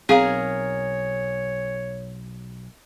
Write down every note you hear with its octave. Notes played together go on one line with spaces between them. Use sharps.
B1 C4 G#4 A#4 C#5 F5